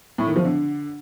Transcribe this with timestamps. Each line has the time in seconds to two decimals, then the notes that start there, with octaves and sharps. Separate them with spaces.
0.18 A2
0.27 D#3
0.36 F3
0.45 D3